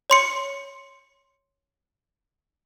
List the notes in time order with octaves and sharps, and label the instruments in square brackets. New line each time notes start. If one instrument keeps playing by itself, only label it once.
[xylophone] C#5 C6 C#7